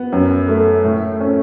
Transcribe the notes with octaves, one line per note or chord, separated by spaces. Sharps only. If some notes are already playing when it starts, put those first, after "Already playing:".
Already playing: B3
F#2
A3
A2
C#4